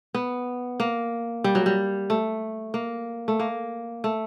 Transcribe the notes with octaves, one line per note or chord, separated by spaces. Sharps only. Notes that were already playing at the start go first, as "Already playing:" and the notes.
B3
A#3
G3
F#3
G3
A3
A#3
A3
A#3
A3